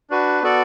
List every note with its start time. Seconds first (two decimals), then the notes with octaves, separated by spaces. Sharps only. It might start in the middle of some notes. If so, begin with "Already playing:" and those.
0.10 D4 F#4 B4
0.42 B3 F#4 A4 D5